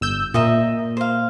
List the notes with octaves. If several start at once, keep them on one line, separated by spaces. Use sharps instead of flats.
G1 E6 G6
A#2 D#5 E5 A#5
C5 F5